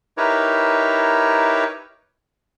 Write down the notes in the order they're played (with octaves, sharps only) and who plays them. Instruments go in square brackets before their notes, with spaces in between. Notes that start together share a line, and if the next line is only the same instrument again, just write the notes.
[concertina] D#4 E4 G4 A#4 B4 C#5